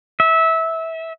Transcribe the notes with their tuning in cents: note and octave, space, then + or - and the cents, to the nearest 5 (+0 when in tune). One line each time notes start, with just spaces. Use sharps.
E5 -20